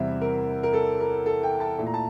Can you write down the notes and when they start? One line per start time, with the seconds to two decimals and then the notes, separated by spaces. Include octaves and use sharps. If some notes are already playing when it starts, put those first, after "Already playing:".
Already playing: E2 C3 G3 C4 E4 E5
0.21 A#4
0.63 A#4
0.73 A4
1.00 A#4
1.26 A4
1.43 G5
1.60 A5
1.78 A#2 A3 E4
1.87 A#5
1.94 A5